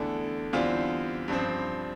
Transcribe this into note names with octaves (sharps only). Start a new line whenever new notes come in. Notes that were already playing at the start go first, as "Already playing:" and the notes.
Already playing: E2 D3 A3
E2 D3 G3 C4 F4
G2 F3 C4